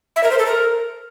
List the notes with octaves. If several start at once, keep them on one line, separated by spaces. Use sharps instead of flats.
E5
A#4
C5
A4
A#4